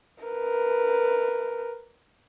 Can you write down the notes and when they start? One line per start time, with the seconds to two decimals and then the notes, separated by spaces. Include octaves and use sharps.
0.24 A#4 B4